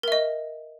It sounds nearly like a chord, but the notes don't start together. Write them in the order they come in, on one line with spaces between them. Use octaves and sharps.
A#4 E5 D#5